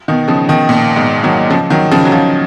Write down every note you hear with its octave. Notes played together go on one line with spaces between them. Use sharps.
B2 D#3
C#3 F3
B2 D#3
A#2
G#2 B2
D#3 F#3
C#3 F3
D#3 F#3
C#3 F3
F#3
C#3 F3